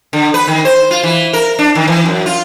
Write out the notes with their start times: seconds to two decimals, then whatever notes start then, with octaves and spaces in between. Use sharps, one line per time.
0.13 D3
0.34 B4
0.47 D#3
0.65 C5
0.91 F4
1.03 E3
1.33 A#4
1.59 D4
1.75 D#3
1.88 E3
2.06 F#2
2.26 F4